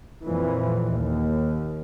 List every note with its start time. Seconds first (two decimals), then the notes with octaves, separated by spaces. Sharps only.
0.25 F2 A#2 E3
0.95 D#2